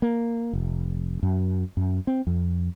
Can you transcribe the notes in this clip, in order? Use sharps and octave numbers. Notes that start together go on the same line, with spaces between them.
A#3
F1
F#2
F#2
C4
F2